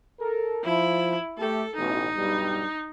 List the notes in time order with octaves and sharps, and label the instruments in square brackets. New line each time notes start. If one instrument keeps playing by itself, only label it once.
[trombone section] A4 A#4
[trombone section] F3 [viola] E4
[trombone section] A3 G4 [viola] A4
[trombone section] A1 B2 [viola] D#4
[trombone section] B1 G2 G3